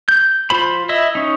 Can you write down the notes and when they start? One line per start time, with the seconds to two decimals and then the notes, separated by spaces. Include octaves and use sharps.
0.09 G6
0.50 F4 C5 B5
0.89 E4 D#5 E5
1.15 C#4 D#4